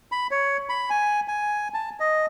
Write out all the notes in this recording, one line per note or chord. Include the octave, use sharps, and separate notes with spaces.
B5
C#5
B5
G#5
G#5
A5
D#5